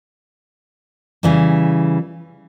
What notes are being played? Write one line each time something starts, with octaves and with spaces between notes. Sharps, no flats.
C#3 E3 G3